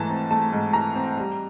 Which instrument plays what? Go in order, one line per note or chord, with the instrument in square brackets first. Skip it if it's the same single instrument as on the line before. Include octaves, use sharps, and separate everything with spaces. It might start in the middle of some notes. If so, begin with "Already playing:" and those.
Already playing: [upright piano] G#2 E3 A3 A5 A#5
C4
A3 A5
G#2
E3 A#5
C4
G3